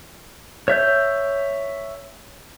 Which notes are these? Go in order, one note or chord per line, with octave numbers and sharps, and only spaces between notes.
C#5 E5 G6